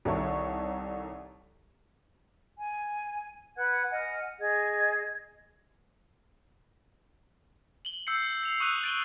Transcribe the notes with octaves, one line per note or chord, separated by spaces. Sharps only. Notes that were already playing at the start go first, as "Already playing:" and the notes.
C2 D#3 A4 C#5 E5 C#6
G#5
B4 F#5 F#6 G#6
D#5 F#5 G#5 F6
G#4 D#5 G#6
F#7 G7
E6 G6 C7 C#7
C7 F7
C#6 D#6 E6 F#6 D#7 F7
A6 D7 F#7 G7